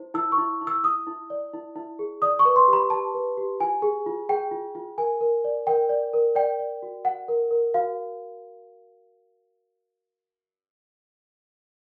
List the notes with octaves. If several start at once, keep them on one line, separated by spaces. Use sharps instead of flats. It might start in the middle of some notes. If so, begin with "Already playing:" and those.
Already playing: E4 C5
E4 E6
C#6
E4
E4
E6
E4 D#6
E4
D5
E4
E4
G#4
D5 D#6
C#6
B4
C6
G4 B5
G4 A5
B4
G4
F4 G#5
G#4
F4
G#4 G5
F4
F4
A#4 G#5
A#4
D5
A#4 G5
D5
A#4
D5 G5
D5
F#4
F#4 F#5
A#4
A#4
F#4 F5